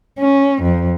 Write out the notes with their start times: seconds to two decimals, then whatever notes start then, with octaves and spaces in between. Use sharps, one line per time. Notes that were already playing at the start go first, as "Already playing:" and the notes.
0.19 C#4
0.62 F2